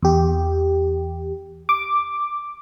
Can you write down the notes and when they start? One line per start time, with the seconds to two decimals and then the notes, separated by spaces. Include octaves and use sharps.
0.03 E2 G4
1.69 D6